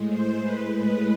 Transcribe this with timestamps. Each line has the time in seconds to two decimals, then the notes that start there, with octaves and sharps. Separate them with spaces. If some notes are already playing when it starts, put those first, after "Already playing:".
Already playing: A2 G#3
0.09 C5
0.42 B4
0.74 A2 G#3 B4